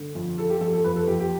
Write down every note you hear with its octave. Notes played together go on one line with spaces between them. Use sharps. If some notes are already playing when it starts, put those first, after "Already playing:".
Already playing: D3
F2
F3 A4
G4
F2 A4
A4
F2 B4
A4
F2 G4
G4